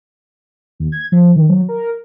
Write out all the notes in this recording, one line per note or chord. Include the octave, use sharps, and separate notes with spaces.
D#2
G#6
F3
D#3
F#3
A#4